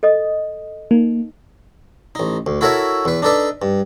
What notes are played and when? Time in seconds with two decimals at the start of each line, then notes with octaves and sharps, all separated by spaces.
0.03 A4 D#5 D#6
0.91 A#3 D#4
2.15 A1 D#4
2.46 D2
2.61 E4 F#4 A4 A#4 C#5 E5
3.05 E2 B4
3.22 D4 D#4 A4 B4 D5
3.62 G2